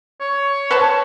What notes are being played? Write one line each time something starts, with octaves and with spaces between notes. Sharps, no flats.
C#5
B4 C5 A5